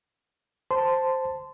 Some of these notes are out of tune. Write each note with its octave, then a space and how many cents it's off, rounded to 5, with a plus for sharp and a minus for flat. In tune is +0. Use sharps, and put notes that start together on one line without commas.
C5 +0 A5 +0 C6 -20